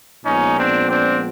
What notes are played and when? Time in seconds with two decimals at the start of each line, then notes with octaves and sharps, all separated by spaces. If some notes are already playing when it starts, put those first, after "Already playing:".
0.25 A#2 F3 G#3 B3 C#4 D#4
0.57 C4 D4
0.89 C4 D4